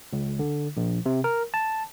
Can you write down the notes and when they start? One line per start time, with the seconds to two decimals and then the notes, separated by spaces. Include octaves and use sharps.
0.13 C#2
0.39 D3
0.77 A#1
1.06 C3
1.24 A#4
1.54 A5